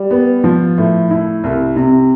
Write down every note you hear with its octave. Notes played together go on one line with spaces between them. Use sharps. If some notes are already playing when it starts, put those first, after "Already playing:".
Already playing: G3
B3
F3
A2
E4
C2
C3